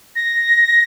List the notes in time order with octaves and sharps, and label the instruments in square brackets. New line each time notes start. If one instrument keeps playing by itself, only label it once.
[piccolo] A#6